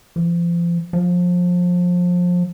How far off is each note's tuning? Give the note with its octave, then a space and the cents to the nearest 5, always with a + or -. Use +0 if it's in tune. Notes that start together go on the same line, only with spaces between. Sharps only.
F3 -35
F3 +25